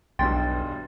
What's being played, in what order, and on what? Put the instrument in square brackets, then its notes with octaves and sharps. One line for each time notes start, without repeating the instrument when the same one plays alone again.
[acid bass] B1 [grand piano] E2 G2 B2 [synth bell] G5 C6 A6